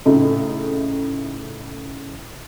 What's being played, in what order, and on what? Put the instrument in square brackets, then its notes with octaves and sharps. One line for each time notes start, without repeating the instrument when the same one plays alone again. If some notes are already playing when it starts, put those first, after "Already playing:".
[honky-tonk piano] A2 C#3 A3 D#4